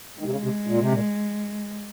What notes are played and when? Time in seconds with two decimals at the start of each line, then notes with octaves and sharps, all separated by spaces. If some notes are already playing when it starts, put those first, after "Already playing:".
0.19 D#3 G#3
0.26 C3
0.31 C#3
0.44 C3
0.67 A#2
0.80 C3
0.93 A#2